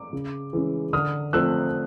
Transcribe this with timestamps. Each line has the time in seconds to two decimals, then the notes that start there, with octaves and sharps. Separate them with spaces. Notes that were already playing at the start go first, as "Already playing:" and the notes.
Already playing: D6
0.13 C#3
0.53 E3 G#3 C#4
0.93 D3 D#6 F6
1.33 F3 A3 C4 E6 F#6